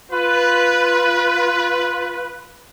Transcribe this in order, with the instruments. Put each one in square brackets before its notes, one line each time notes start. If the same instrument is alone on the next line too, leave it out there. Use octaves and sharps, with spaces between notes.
[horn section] F4 B4